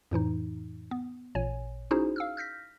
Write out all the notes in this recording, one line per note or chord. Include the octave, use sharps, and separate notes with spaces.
F2 A2 E3 D#4
B3
A1 A#2 C#5 G#5
C#4 D#4 E4 F#4 G#4 C5
F5 E6 F6
F6 G6 A#6 B6